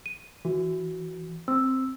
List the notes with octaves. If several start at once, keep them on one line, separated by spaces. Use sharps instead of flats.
D#7
E3 F#4
C4 E6